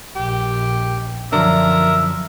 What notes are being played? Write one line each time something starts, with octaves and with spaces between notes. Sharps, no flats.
A#1 G4
F#2 D3 F3 D4 A#4 E5